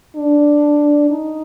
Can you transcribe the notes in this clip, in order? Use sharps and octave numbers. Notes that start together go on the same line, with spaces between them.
D4
D#4